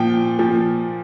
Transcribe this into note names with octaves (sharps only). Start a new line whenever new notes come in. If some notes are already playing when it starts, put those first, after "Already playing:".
Already playing: A#2 F3 G5
A#2 F3